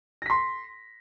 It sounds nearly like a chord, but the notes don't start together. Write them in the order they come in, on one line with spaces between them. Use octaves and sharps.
A#6 B6 C6